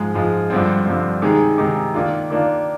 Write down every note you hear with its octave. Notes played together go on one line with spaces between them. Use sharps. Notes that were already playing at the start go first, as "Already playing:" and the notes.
Already playing: G#2 F3 G#3
G#2 F3 G#3
G2 D3 F3 C4
G2 D3 F3 C4
C3 D#3 G#3 D#4 G#4
C3 D#3 G#3 D#4 G#4
D#3 A#3 D4 F4
D#3 A#3 D4 F4